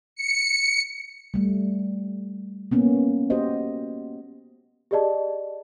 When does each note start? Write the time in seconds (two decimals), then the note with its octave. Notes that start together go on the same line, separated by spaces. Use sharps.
0.16 C#7
1.34 G3 A3
2.71 A#3 B3 C#4
3.30 F#4 G4 C5 D#5
4.91 G4 G#4 D5 D#5 A5